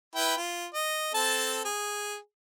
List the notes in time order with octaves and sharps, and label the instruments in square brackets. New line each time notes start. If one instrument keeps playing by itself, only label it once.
[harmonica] E4 B4 G5
F4
D#5
C4 A4 A5
G#4